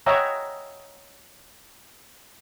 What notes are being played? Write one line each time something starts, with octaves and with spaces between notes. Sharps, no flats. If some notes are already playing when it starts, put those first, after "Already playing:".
C#5 D#5 E5 F#5 G5 A#5